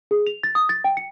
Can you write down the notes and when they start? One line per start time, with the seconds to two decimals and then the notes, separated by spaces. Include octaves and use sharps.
0.11 G#4
0.27 F7
0.43 A6
0.55 D#6
0.69 A6
0.84 G5
0.97 C#7